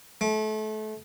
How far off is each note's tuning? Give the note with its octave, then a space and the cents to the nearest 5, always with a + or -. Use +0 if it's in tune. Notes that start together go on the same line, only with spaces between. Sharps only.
A3 -30